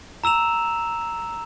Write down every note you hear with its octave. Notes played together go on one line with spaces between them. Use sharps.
A#5 E6 E7 F7